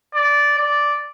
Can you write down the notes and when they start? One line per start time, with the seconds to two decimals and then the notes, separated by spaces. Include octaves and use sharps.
0.14 D5
0.58 D5